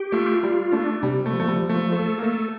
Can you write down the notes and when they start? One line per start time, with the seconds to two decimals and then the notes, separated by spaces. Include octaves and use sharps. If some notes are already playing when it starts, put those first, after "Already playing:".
Already playing: G4
0.12 A3 F4
0.43 G3 F4
0.72 A3 D4
1.03 C3 G3
1.26 A3
1.33 F3
1.40 A3
1.48 G3
1.62 F3
1.69 A3
1.92 A3 A4
2.18 A#3
2.22 A3 A4